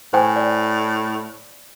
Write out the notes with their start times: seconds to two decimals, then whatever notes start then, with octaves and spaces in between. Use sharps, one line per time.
0.13 A2 C5 G5 G#5
0.36 D5